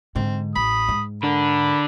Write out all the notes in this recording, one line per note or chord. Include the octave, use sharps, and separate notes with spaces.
G#2 D3 C4
A1 B5 D#6
G#2
D3 D4 A#4 B5